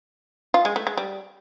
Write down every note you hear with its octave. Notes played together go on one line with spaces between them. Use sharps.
F4
G#3
A3
G#3
G3